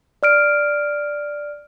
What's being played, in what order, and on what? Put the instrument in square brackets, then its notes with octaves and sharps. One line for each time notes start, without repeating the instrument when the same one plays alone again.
[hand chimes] D5 F6 D7